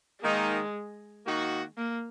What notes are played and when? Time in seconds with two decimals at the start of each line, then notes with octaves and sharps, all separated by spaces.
0.22 D#3 G#3 A#3 D#4
1.26 D#3 A#3 D#4 F#4
1.78 A#3